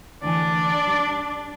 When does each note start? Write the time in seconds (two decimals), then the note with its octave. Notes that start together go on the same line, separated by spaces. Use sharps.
0.22 D2 E3 D4 D5 G#5
0.87 G3